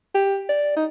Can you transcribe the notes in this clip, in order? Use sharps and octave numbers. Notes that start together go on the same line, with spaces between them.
G4
D5
D#4